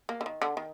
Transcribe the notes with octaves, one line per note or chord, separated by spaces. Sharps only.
A#3
D3
D#3
D3
D#3